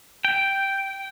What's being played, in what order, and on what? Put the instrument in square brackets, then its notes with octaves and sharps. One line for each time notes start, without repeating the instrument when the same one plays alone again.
[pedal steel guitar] G5